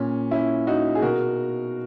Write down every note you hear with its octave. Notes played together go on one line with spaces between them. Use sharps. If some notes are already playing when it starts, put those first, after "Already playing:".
Already playing: A#2 C#4
C#4 E4
D#4 F#4
G#4
B2 F#4 A#4